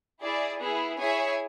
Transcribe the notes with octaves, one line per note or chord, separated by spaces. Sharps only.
E4 G#4 D5
B3 E4 G#4
E4 G#4 C#5 E5 G#5